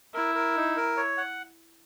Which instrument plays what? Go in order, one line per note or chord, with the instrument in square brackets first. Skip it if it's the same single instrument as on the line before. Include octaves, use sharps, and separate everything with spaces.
[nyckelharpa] E4 [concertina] A#4
[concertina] A#4
D#4
A#4
C#5
F#5